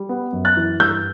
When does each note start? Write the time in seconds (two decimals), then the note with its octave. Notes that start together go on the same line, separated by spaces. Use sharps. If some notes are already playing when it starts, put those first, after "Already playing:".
Already playing: G3
0.09 B3
0.33 F#2
0.45 F#6 A6
0.57 E3
0.80 G2 E6 G6